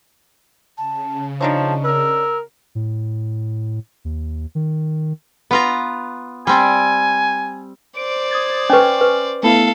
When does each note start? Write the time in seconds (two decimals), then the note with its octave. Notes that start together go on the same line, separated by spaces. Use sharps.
0.78 C#3 A5
1.41 F3 D4 D#4 C#5 A5
1.84 A#4 E6
2.75 A2
4.05 D#2
4.55 D#3
5.51 B3 F4 A#5
6.47 G3 C4 D5 G#5
7.97 C5 D5 D7
8.31 D#6 G#6 A6
8.70 C#4 B4 G#5 C#6
9.01 B4
9.43 A3 B3 E4 A4 F5